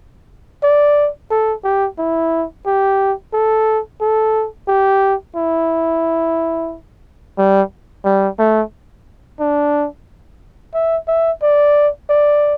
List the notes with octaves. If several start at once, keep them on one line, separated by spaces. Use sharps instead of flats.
D5
A4
G4
E4
G4
A4
A4
G4
E4
G3
G3
A3
D4
E5
E5
D5
D5